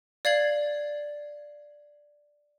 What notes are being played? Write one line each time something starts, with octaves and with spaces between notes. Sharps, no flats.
D5 F5 G#6 C7 F#7